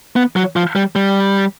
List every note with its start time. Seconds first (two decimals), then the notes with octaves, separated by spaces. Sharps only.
0.16 B3
0.36 F#3
0.56 F3
0.76 G3
0.96 G3